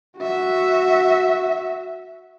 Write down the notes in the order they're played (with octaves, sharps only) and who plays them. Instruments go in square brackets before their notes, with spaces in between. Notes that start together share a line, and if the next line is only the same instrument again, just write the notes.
[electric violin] F#4 E5